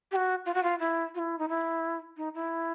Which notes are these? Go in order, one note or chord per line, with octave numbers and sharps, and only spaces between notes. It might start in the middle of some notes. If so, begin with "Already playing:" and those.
G4
F#4
F4
F#4
F4
E4
F4
E4
D#4
E4
D#4
E4